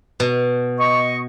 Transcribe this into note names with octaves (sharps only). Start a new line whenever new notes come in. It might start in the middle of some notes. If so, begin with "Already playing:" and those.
B2
D#5 C#6